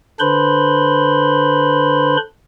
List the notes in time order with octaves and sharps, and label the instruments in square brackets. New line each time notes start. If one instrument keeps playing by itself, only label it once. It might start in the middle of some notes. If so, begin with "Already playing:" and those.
[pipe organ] D3 D4 B4 C5 B5 C6